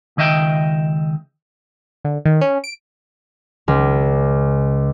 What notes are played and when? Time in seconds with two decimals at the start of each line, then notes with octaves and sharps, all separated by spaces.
0.17 C#2 D#3 D#5 E5 G5
2.05 D3
2.25 D#3
2.41 C#4
2.64 D7
3.68 C#2